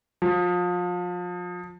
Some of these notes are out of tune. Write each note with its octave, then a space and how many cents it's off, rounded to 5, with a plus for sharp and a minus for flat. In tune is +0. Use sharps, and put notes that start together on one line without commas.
F3 +30